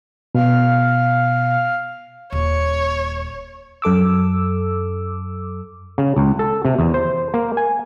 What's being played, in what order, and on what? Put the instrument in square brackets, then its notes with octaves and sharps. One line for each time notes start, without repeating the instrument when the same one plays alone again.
[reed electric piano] B2 [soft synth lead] F5
[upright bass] D#1 [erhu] C#5
[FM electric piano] F#2 A4 D6 E6
[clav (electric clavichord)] C#3
C#2
A4
C3
E2
C5
A#3
G#5